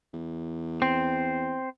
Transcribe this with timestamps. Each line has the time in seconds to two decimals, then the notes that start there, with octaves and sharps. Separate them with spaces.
0.13 E2
0.82 C4